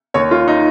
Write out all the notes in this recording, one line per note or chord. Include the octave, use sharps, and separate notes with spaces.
D#2 C#5
F4
D#4